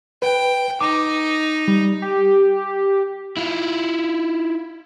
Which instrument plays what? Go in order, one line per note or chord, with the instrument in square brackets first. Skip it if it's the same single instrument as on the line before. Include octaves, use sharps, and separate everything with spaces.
[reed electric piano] B4 [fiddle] G5
[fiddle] D#4 [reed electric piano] D6
[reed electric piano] G3
[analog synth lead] G4
[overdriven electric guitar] E4 F4